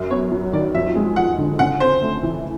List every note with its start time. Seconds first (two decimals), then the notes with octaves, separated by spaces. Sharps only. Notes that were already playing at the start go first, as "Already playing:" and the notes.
Already playing: F#2
0.10 B3 C#5
0.32 F#3
0.53 D#3 D5
0.74 F2 E5
0.96 G#3
1.16 F3 F#5
1.38 D3
1.59 C#3 F#5
1.80 C4 C5
2.02 A3
2.23 E3